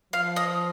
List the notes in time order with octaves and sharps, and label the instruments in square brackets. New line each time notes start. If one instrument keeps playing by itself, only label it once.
[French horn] F3 [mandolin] F5
[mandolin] D#5